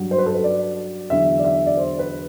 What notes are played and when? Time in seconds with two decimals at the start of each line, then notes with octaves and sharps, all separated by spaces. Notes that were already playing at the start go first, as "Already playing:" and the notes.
Already playing: G2 F#3
0.11 C5
0.18 B4
0.26 A4
0.35 B4
0.44 D5
1.10 E2 D3 F#3 E5
1.39 D5
1.44 E5
1.66 D5
1.77 C5
1.99 B4